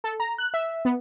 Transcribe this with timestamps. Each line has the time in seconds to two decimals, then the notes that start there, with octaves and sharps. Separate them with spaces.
0.04 A4
0.20 A#5
0.38 F#6
0.54 E5
0.85 B3